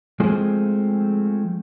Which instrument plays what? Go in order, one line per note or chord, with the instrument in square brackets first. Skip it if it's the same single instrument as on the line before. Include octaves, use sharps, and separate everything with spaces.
[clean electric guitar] F3 G#3 A3 C4 F4 G#4